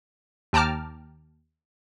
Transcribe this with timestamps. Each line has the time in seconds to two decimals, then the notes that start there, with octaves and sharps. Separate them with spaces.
0.53 D#2 G5 A5 A#5 D6 F6